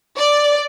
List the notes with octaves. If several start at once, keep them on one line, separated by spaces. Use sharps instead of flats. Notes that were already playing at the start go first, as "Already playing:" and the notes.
D5